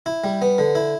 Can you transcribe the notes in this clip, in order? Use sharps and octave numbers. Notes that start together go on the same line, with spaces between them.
E4
G3
B3
D3
E4